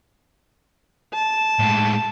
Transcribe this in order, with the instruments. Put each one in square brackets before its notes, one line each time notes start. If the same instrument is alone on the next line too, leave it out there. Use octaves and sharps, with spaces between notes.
[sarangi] A5
[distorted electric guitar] A2 G#3